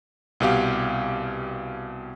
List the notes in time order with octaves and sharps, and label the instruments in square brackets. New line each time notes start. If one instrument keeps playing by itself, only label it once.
[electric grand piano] C2 B2 G4 F5